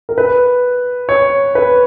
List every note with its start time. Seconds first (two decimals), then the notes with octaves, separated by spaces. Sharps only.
0.09 A#4
0.18 B4
1.09 C#5
1.55 B4